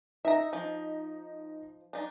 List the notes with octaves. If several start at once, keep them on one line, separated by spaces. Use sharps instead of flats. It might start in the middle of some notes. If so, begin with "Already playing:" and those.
D#4 E5 A#5
F3
D4 D#4